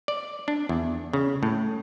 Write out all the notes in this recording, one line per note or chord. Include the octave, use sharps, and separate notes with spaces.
D5
D4
E2
C#3
A2